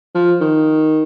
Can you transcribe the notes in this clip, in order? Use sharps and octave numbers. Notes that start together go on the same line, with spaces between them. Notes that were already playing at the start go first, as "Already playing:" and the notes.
F3
D#3